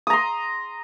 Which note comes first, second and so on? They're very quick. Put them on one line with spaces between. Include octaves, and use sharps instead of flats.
D#6 A#5 C6